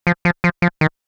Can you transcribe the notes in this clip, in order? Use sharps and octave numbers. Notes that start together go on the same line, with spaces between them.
F3
F3
F3
F3
D#3